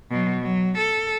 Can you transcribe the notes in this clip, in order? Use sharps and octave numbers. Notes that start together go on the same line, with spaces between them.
B2 F#3
F#3
A4